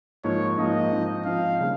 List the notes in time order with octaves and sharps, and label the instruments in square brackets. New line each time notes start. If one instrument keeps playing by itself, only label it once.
[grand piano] G#2 F3 A#3 [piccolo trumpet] C#5
[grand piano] G#2 F3 A#3 [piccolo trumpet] D#5
[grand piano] G#2 F3 C4 D#4
[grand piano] G#2 F3 C4 D#4 [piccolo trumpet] F5
[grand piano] C#3 G3 A#3